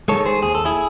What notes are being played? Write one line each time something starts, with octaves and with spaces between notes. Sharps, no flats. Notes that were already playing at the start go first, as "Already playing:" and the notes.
D#3 G#3 A4 C#5
G#4 C5
D#2 G#4
A4
E4 G#4